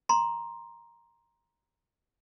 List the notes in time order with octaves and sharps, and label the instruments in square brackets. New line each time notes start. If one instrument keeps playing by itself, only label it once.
[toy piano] A#5 C6